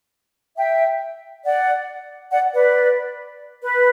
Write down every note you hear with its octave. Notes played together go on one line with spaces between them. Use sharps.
E5 G5
D5 F#5
D5 F#5
B4 D5
B4